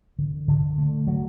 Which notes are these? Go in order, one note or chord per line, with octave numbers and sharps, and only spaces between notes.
D3
D3
A3
F#3